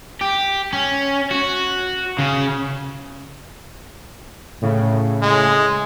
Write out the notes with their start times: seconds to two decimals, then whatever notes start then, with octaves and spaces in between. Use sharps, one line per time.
0.21 G4
0.73 C#4
1.31 F#4
2.19 C#3
4.61 A2 C#3
5.22 G#3